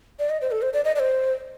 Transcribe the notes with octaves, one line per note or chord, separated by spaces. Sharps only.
D5
D#5
C5
A4
C5
D5
D#5
D5
C5